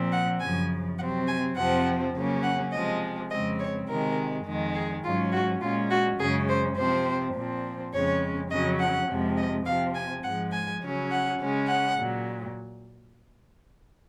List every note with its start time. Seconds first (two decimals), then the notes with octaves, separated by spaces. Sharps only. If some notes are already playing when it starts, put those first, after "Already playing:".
Already playing: A#2 F3 C4
0.12 F#5
0.41 F#2 C#3 F3 G#5
0.98 C3 F#3 C4 F#5
1.27 G#5
1.56 F2 C3 F3 C4 F#5
2.14 C#3 F#3 A#3 C#4
2.43 F#5
2.72 C3 F3 G#3 D#5
3.30 F2 C#3 G#3 C4 D#5
3.59 C#5
3.88 C3 D#3 G#3 A#4
4.45 F2 D#3 G#3
4.75 G#4
5.04 G#2 F#3 C#4 F4
5.32 F#4
5.61 A#2 G#3 C#4 F4
5.90 F#4
6.19 F#2 C#3 G#3 C#4 G#4
6.49 C5
6.76 C3 F3 C4 C5
7.35 A#2 F3 C4
7.92 F2 C#3 G#3 C#4 C#5
8.51 F2 C#3 F#3 C#4 D#5
8.80 F#5
9.08 F2 C3 F3 G#3
9.37 D#5
9.65 C3 F3 C4 F5
9.95 G#5
10.24 G#2 F3 G#3 F#5
10.52 G#5
10.82 C#3 F#3 C#4
11.11 F#5
11.39 C#3 G#3 C#4
11.68 F#5
11.98 A#2 F#3